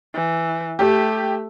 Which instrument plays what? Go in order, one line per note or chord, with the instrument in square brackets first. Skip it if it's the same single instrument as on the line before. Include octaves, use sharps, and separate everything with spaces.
[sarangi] E3
[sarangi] A3 [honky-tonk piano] G4